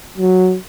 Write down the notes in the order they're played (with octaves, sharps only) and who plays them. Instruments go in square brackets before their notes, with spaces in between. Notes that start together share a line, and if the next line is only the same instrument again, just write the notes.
[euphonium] F#3